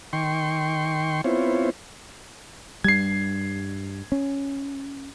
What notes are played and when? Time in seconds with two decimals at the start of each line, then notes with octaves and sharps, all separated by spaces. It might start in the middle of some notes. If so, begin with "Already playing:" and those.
0.13 D#3 G5 C6 C#6
1.24 B3 C4 E4 F4 C5 C#5
2.84 G2 G3 G#6 C7
4.12 C#4